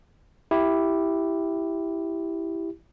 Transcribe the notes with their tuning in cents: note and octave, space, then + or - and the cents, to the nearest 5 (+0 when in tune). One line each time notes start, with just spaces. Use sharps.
E4 +0 G4 +0